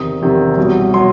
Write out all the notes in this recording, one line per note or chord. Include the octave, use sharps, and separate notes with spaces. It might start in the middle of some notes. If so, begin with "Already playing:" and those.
Already playing: E2 C3 D#3 D#6
E2 C3 D#3
C2 B2 F#3
B2 F#3 C6